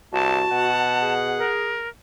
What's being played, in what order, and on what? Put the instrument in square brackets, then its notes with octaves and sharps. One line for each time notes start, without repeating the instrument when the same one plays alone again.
[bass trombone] C2 [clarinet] F#4 [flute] A5
[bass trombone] B2 [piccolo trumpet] F#5
[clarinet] G#4
[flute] A#4